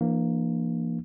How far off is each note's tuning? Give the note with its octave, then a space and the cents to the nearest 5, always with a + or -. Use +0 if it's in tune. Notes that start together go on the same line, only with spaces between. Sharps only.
E3 +40 A#3 +0 D4 +25